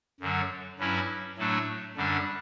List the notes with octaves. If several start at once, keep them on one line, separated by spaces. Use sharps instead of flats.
F#2 D3 F#3
G2 F#3 C#4 E4
A2 F#3 A3 D4
F#2 D3 G3 D4